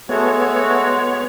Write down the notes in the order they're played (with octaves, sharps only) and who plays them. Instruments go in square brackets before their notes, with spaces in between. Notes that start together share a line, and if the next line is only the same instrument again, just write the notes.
[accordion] G#3 [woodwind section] A3 F#4 [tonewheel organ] B3 C#5